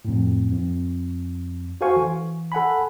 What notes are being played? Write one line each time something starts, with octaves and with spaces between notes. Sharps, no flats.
F2 A2
F2
F#4 A4 C5 F5 G#5 C#6
E3
A4 F#5 G#5 B5